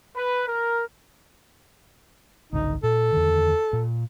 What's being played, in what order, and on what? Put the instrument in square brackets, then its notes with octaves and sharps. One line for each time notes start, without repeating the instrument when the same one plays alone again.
[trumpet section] B4
A#4
[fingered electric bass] G#1 C#2 D3 [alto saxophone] D#4
[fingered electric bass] A#2 [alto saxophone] A4
[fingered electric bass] E2 D3 D#3
A#2